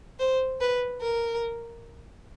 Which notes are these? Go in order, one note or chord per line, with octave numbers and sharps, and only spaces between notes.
C5
B4
A#4